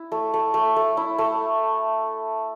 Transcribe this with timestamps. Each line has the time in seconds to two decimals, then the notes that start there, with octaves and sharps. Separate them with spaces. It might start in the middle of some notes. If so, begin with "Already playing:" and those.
Already playing: E4
0.12 A3
0.34 A3
0.54 A3
0.76 A3
0.97 E4
1.18 A3